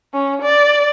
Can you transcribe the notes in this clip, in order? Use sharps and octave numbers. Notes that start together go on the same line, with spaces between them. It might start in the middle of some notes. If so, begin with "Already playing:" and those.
C#4
D5